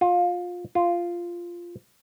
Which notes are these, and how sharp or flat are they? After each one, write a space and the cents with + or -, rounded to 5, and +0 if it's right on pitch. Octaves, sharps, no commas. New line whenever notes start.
F4 +20
F4 -10